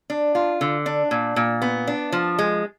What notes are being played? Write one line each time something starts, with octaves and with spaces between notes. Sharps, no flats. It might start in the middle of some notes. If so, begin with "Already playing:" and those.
D4
F4
D3
D4
A#2
A#2
B3
D4
F3
G#3